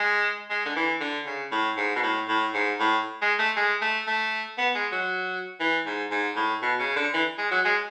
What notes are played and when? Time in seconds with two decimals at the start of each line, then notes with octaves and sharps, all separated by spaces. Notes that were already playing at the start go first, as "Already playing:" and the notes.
Already playing: G#3
0.50 G#3
0.65 D3
0.76 E3
1.00 D3
1.26 C#3
1.52 A2
1.77 G#2
1.95 B2
2.03 A2
2.29 A2
2.54 G#2
2.80 A2
3.22 G#3
3.39 A3
3.56 G#3
3.82 A3
4.07 A3
4.58 B3
4.75 G#3
4.92 F#3
5.60 E3
5.86 G#2
6.11 G#2
6.36 A2
6.62 B2
6.79 C#3
6.96 D3
7.14 E3
7.38 G#3
7.51 F#3
7.65 G#3